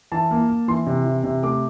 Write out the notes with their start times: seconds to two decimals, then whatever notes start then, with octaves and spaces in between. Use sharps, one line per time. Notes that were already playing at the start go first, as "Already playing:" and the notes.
0.12 E3 A5
0.31 A#3
0.49 A#3
0.68 E3 C6
0.87 C3
1.05 E3
1.24 C3
1.43 A3 D6